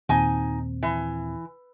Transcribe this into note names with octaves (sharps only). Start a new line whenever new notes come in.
D#2 A#2 C4 D#4 G#5
E3